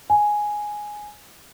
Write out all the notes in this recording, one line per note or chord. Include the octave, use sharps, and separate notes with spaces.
G#5